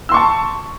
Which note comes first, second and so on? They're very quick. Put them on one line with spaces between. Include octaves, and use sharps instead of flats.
E6 C6 C#6 A5